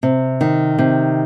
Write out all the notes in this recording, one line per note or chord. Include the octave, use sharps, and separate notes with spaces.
C3
D#3
C3